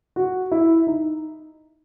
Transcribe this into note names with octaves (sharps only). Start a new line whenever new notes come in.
F#4
E4
D#4